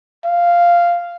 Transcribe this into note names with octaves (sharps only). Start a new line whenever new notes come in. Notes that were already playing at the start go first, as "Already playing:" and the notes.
F5